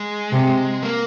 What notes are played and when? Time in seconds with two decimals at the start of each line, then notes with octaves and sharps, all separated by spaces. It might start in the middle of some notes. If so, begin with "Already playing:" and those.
Already playing: G#3
0.32 C3
0.83 A#3